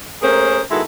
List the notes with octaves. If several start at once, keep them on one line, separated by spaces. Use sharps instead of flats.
A3 A#3 C#4 G#4 A#4 C5
D#3 G#3 B3 E4 F#4 A4